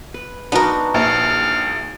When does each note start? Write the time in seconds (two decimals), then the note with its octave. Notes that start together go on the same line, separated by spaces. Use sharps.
0.14 B4
0.52 B3 D4 D#4 F#4 A#4
0.94 A#1 F5